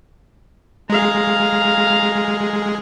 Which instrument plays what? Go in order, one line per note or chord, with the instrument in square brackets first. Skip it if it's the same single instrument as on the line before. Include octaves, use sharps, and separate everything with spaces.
[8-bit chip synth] G#3 G#4 [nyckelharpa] F5 A#5